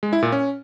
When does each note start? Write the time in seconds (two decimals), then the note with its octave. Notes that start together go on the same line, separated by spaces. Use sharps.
0.03 G#3
0.13 E4
0.22 A#2
0.32 C#4